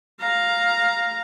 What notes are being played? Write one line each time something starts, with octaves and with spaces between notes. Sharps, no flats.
F5 A#5